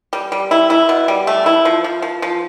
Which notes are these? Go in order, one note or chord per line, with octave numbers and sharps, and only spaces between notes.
G3
G3
E4
E4
B2
G3
A3
E4
F3
F3
F3
F3